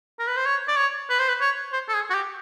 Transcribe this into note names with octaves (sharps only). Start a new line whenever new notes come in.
A#4
B4
C5
C#5
D5
C#5
B4
C5
B4
C#5
C5
A4
G#4
F#4
G4